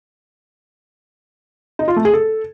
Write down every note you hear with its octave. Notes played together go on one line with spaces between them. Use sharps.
D#4
F4
A3
G#4
A4